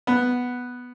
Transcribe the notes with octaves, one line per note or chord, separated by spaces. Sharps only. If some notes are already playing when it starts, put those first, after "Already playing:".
B3